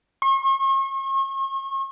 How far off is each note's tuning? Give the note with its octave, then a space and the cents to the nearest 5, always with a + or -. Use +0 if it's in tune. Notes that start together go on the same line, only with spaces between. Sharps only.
C#6 -40